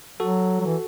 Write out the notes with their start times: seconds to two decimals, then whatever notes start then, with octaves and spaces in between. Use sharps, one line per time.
0.20 F#3 F#4 A4
0.61 F#3
0.66 E3